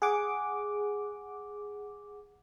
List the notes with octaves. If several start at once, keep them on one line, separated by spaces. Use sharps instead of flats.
G#4 F#5 D6